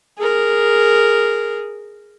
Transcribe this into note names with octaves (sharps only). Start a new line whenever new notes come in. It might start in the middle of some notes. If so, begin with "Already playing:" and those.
G#4 A#4